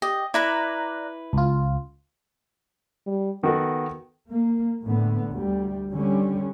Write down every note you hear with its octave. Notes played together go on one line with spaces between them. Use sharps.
G4 D#5
E4 B4 D5 A#5 B5 F#6
C#2 F4
G3
D#3 B3 F#4 A4
A#3
A2 D3 B3
D2 G3
D3 G3 C#4